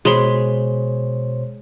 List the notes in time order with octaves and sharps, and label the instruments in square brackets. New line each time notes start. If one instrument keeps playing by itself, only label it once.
[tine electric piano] B2 C5 C#5 [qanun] G#3 B5 C6